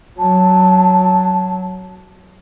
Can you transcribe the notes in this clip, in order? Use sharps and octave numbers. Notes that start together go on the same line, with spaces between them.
F#3 A5